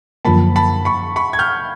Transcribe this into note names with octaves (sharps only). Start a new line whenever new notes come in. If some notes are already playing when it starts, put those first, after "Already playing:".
F#2 D3 F3 A#3 A5 B5
A5 B5
B5 C#6
B5 C#6
G#6
F6 G6